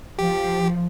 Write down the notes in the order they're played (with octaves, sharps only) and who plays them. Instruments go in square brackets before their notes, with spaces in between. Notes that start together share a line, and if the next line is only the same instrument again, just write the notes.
[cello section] F3 [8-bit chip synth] G4